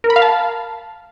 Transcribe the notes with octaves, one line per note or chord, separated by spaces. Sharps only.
A#4
B5
F5
A5